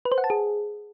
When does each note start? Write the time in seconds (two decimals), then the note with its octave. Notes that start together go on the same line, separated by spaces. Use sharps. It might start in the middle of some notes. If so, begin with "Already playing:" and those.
0.05 B4
0.12 C5
0.18 F#5
0.24 A5
0.30 G#4